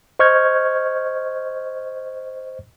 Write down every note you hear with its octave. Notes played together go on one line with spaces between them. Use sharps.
C5 D#5 C#6 F6 G6 G#6